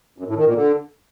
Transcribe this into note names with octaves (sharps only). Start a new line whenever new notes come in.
F#2
A2
D#3
A#2
D3